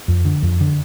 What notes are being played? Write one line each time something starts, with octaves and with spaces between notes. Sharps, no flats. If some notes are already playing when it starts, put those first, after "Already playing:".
F2
D3
F2
D3